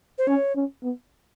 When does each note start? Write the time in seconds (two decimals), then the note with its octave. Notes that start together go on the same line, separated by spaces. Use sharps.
0.18 C5
0.27 C#4 C#5
0.56 C#4
0.83 B3